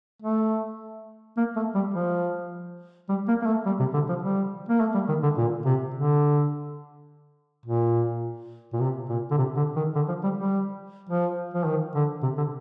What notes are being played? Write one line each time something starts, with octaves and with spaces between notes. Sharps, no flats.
A3
A#3
A3
G3
F3
G3
A#3
A#3
A3
G3
C3
D3
F3
G3
A#3
A3
G3
D#3
D3
A#2
C3
D3
A#2
A#2
C3
A#2
D3
C3
D3
D#3
D3
F3
G3
G3
F3
F3
D#3
D3
C3
D3